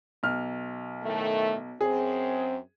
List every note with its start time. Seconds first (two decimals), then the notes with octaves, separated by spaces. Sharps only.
0.23 B1 F6
1.04 A2 D#3 A3
1.81 F#2 C4 G#4